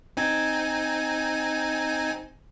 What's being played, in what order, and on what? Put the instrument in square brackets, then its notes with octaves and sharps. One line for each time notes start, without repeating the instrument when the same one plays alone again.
[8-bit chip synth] C4 D#4 G#5